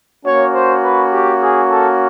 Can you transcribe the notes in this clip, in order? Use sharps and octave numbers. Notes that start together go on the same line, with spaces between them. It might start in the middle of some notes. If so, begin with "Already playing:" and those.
A#3 C#4 F#4 C#5
C5
B4
G4
G#4
A4